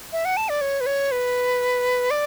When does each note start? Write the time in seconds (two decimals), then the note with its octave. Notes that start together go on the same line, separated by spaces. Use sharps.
0.13 E5
0.25 F#5
0.37 A5
0.49 D5
0.61 C#5
0.81 B4
0.86 C#5
1.12 B4
2.11 D5